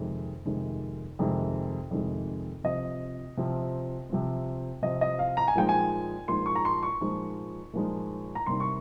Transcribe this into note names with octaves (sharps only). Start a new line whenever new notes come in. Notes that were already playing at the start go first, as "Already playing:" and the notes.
Already playing: F2 C3 D#3 G#3
F2 C3 D#3 G#3
F2 C3 D#3 G#3
F2 C3 D#3 G#3
C3 F3 C4 D#5
C3 F3 C4
C3 F3 C4
C3 F3 C4 D#5
D#5
F5
A#5
G#5
A#2 F3 G#3 D#4 G5
G#5
A#2 F3 G#3 D#4 C6
C#6
A#5
C6
C#6
A#2 F3 G#3 D#4
A#2 F3 G#3 D#4
A#5
C3 G3 A#3 D#4 C6
C#6